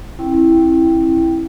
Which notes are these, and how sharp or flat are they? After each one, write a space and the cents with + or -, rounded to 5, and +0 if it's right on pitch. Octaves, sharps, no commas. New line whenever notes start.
C4 +45 E4 +0 G5 +0